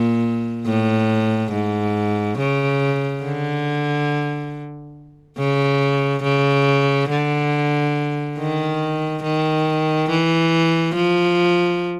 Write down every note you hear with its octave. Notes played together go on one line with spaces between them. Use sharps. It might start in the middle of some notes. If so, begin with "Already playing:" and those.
Already playing: A#2
A2
G#2
C#3
D3
C#3
C#3
D3
D#3
D#3
E3
F3